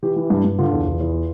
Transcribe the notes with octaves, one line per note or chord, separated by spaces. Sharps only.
E3 G4
E3
G2
G2
D3 F4
E2
E2
E2